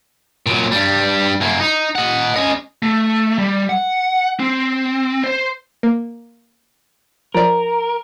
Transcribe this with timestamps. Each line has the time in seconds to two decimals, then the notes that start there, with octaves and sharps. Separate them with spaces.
0.47 A#2 F#3
0.72 G2 G3
1.41 F#2 A#3
1.60 D#4
1.95 D#5 F#5
2.36 C#4 D#5
2.83 A3
3.38 G3
3.70 F#5
4.40 C4
5.24 C5
5.83 A#3
7.34 F3 A#4 D5